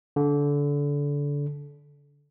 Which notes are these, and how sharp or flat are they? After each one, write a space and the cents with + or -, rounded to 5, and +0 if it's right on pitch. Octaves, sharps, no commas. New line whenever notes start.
D3 -25